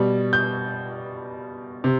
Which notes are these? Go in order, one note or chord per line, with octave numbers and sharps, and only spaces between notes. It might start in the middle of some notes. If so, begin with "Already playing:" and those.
Already playing: B2 G3
G6
C3